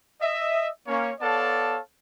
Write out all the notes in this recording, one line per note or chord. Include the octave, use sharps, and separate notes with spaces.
D#5 E5
A#3 C#4 C#5
B3 A4 C#5 D5 F5 A5